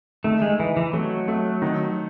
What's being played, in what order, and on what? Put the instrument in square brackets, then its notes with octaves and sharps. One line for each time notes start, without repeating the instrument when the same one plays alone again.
[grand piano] D#3 [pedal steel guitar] A3
[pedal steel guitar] G#3
[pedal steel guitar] E3 [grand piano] D#4
[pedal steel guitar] E3
[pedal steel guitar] F#3 [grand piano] A3
[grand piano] A3
D#3